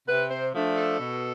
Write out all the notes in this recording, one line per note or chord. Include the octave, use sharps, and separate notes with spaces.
C3 B4
C5
F3 A3 D4
A4
B2